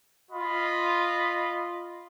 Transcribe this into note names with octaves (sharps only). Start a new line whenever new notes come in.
F4 D#5 B5